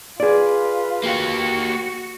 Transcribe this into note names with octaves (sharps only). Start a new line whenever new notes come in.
F4 G#4 B4 D5
A#3 F#4 G4